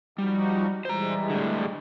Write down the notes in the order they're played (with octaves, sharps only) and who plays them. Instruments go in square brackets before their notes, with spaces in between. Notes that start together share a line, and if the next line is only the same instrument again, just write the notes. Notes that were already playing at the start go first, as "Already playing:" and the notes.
[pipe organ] F3 D#4 F#4 [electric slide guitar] G3
[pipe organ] E3 G3 G#3 [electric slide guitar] C5 A#5
[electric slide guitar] A2 D3